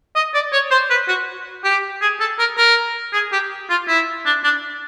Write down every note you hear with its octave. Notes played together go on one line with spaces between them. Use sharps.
D#5
D5
C#5
C5
B4
F#4
G4
G#4
A4
A#4
A#4
G#4
G4
F4
E4
D4
D4